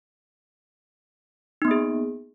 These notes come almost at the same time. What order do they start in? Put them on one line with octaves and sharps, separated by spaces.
D#4 B3 A#3 G#4